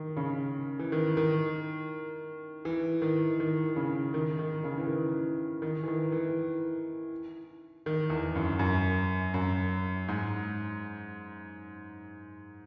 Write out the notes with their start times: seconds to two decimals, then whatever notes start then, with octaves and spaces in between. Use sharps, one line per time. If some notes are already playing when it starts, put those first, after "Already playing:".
Already playing: D#3
0.17 C#3
0.79 E3
0.92 D#3
1.17 D#3
2.65 E3
3.02 D#3
3.40 D#3
3.76 C#3
4.14 D#3
4.39 D#3
4.64 C#3
4.78 E3
4.88 D#3
5.62 D#3
5.83 E3
5.88 D#3
6.12 E3
7.86 D#3
8.10 E2
8.36 F#2
8.59 F#2
9.34 F#2
10.08 G#2